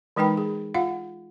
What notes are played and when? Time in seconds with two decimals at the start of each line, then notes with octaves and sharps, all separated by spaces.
0.16 E3 G#3 D#4 B4 G5 B5
0.37 G#4
0.74 F4 F5 F#5